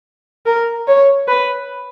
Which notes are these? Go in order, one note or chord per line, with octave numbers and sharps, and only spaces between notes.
A#4
C#5
B4